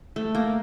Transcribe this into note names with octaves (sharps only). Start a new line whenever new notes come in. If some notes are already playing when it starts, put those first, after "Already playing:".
A3
A#3